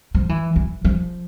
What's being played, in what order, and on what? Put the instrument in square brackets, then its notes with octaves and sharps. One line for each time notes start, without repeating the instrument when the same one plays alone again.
[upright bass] F3
E3
E3
F3